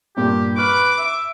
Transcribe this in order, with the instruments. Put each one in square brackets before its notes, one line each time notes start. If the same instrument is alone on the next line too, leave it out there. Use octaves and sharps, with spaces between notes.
[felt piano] G2 A#2 G3 [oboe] G4
[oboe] B4 [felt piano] C#6 F6 F#6 [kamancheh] D6
[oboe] E5